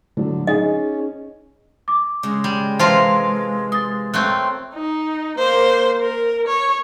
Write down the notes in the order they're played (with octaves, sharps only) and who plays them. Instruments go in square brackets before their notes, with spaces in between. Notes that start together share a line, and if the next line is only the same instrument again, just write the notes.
[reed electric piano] A2 F#3 [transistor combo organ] D3
[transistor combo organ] C#4 [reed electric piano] D#4 G#4 [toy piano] D#5
[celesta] D6
[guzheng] C#3 [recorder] G#3
[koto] G3
[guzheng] C3 E3 [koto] F4 A#4 F5 [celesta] C5 A5 C6
[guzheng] C6 [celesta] D#6 A6
[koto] A3 C4 [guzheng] F4 A#4 C#5 [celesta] F#6
[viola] D#4
A#3 C5
A#4
C#5